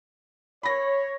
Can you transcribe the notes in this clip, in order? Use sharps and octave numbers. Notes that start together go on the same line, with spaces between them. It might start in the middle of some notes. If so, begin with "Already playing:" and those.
C#5 B5 A#6